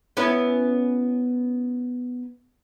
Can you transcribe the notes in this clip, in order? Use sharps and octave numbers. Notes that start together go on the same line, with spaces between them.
B3 C#4 E4